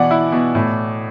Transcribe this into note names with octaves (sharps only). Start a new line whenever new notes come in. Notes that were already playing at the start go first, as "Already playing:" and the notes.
Already playing: B2 E3 D5 F#5
E4
B2
A2